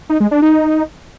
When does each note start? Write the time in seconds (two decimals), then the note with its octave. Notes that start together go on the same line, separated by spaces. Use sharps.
0.09 D#4
0.20 G#3
0.31 D4
0.42 D#4